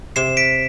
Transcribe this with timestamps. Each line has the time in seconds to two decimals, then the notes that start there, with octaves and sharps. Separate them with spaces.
0.16 C3 C7 E7
0.37 B6 D7